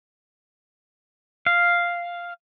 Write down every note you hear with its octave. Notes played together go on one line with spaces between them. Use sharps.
F5